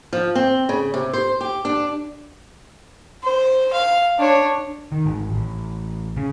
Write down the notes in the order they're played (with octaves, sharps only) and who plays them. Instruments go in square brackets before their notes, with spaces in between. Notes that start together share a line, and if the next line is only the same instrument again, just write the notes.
[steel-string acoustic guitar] F3
C4
C#3
C3
C5
G4
D4
[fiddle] C5
F5
D4 C#5
[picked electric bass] D#3
G#1
A1
C#3